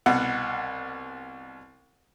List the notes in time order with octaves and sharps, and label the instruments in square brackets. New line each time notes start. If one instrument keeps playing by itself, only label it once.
[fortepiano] C2 B2 F#5